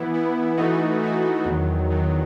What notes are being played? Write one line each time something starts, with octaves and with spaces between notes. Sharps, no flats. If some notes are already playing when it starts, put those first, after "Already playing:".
Already playing: E3 B3 E4
E3 B3 E4
E3 A3 D#4 F#4
E3 A3 D#4 F#4
E2 D#3 F#3
E2 D#3 F#3